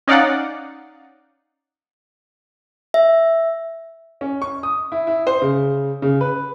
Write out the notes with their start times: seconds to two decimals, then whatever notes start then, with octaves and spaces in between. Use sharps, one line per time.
0.08 C#4 D#4 D5 F5 F#5
2.94 E5
4.21 C#4
4.42 C#6
4.63 D#6
4.92 E4
5.07 E4
5.27 C5
5.42 C#3
6.02 C#3
6.21 B4